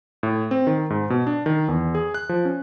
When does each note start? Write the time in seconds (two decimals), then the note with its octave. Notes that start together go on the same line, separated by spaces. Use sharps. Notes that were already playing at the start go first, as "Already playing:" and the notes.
0.23 A2
0.51 C4
0.67 D#3
0.90 G#2
1.10 B2
1.27 D4
1.46 D#3
1.68 E2
1.95 G#4
2.14 F#6
2.29 F3
2.45 C#4